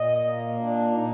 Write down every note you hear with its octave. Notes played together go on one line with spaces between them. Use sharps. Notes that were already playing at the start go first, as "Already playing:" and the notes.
Already playing: A#2 D#5
A#3
A#2 D4
A#2 D#4